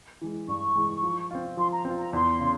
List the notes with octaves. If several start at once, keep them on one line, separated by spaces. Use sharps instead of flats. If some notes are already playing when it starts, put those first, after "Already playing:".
E3 G#3
G2 C#6
E3 G#3
F3
C4 F4
F3 C6
A#5
C4 F4
A#5
E2 C6
C#3